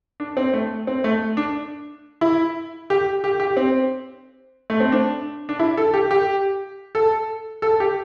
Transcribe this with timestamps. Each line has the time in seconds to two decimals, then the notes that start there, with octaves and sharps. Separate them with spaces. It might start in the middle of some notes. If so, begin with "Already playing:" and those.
0.20 D4
0.37 C4
0.54 A3
0.87 C4
1.04 A3
1.37 D4
2.21 E4
2.90 G4
3.24 G4
3.40 G4
3.57 C4
4.70 A3
4.80 C4
4.92 D4
5.49 D4
5.59 E4
5.77 A4
5.94 G4
6.11 G4
6.95 A4
7.62 A4
7.80 G4